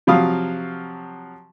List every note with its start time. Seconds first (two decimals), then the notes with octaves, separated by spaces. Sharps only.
0.07 C3 F3 F#3 F5 D#6